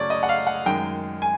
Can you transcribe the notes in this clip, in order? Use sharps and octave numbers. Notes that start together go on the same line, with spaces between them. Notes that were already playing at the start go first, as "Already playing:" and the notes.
Already playing: F#2 C#3 F#3 A3 C#5 D5
D#5
F#5
F5
F#5
F#2 D#3 G#3 G5
G#5